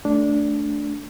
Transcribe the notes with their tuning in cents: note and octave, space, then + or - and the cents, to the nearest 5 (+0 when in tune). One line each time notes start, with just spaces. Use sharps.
A3 +0 D4 -10